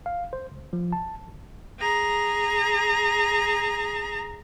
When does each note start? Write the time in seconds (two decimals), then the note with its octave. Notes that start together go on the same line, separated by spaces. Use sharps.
0.06 F5
0.33 C5
0.52 C#2
0.73 F3
0.92 A5
1.28 G#1
1.80 G#4 A#5